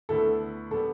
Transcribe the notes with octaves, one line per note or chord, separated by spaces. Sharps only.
D2 D3 B3 E4 A4
D3 G3 B3 A4